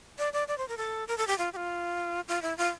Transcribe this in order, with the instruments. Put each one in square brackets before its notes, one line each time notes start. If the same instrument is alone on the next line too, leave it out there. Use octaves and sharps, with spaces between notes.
[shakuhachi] D5
D5
D5
C5
A#4
A4
A#4
A4
G4
F4
G4
F4
F4
E4
F4